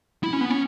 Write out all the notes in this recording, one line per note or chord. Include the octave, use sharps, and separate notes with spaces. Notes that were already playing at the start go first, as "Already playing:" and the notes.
E4
C#4
B3
C#4